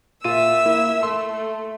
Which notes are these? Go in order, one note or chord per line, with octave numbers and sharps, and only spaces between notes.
A#2 F4 E5 E6 D#7
A#3 E4
A3 C6